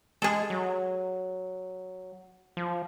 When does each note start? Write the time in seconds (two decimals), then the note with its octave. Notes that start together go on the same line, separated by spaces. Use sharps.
0.22 G#3 G#4 A4
0.50 F#3
2.57 F3